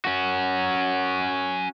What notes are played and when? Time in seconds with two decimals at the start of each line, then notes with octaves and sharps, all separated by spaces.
0.05 C#4 F#4